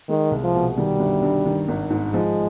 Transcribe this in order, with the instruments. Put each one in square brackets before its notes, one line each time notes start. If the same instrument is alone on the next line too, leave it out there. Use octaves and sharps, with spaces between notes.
[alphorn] D#3 [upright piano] G#3
[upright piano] C2
[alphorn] F3
[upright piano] B2
[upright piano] D#3 [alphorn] G3
[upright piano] G1
G2
D#3
G#1
G#2
[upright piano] F3 [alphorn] G#3